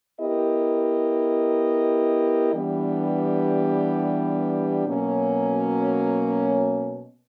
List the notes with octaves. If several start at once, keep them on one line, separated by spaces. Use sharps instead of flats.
B3 E4 G4 A#4 D#5
E3 G3 B3 D4 G4
B2 F#3 A#3 C#4